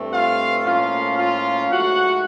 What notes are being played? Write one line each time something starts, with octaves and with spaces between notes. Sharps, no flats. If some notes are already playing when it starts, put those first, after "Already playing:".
Already playing: G2 E3 A3 C4
F4 F5
A2 F3 A#3 C#4 F4 F5
F4 F5
G#2 F3 A3 F#4 F#5